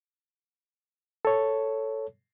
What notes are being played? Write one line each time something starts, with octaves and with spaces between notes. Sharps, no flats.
A4 C#5